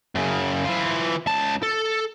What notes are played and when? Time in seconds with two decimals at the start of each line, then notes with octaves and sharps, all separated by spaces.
0.15 F#2 C#3
0.65 E3 F4
1.27 C#2 A5
1.63 A4